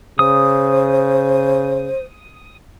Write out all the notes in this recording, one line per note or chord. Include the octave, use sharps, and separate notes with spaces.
C#3 C5 D#6